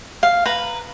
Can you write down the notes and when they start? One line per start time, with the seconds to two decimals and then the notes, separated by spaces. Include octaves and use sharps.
0.23 F5
0.46 B4 A#5